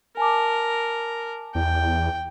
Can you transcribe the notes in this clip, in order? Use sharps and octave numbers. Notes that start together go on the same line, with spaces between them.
A#4 G#5 A5 D6
E2 G5